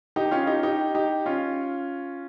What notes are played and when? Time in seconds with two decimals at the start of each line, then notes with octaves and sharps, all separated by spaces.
0.16 D#4 G4
0.31 C#4 F4
0.47 D#4 G4
0.63 D#4 G4
0.95 D#4 G4
1.26 C#4 F4